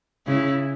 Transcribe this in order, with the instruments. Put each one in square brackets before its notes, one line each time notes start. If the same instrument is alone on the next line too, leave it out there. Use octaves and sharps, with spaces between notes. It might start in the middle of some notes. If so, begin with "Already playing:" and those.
[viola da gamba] C#3 [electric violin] E4